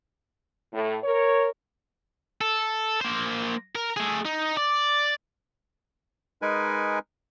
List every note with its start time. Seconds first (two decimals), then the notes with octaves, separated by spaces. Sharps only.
0.73 A2
1.03 A#4 C#5
2.41 A4
3.01 A#3 C5
3.75 A#4
3.97 A3 G#4
4.25 D#4
4.57 D5
6.42 G#3 D#4 A#4 B4 G#5